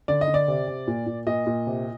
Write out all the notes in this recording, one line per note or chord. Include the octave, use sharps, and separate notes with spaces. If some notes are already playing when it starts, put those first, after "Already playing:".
D3 D5
D#5
D3
D5
C3
C3
A#2
A#2
A#2 D#5
A#2
C3